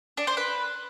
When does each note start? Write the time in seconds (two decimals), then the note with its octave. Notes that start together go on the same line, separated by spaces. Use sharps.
0.17 D4
0.27 C5
0.37 B4